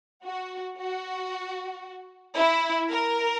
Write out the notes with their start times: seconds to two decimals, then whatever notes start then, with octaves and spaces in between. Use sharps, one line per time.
0.24 F#4
0.78 F#4
2.37 E4
2.90 A#4